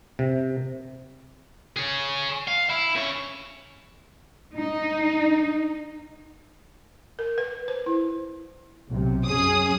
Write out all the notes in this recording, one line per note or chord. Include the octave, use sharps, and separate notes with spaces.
C3
G#4 C#5
F5
E4
C#3 C#5
D#4
A#4
B4
C5
E4
B1 C3
F#2 C#4 G#4 D#6